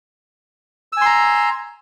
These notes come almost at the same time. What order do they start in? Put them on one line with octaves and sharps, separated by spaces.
E6 G#5 C6 A#5